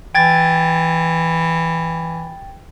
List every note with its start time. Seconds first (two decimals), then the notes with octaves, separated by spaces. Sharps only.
0.15 E3 G5 G#6 A6